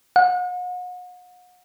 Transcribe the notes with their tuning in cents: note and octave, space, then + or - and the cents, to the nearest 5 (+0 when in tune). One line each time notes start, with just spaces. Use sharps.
F#5 -40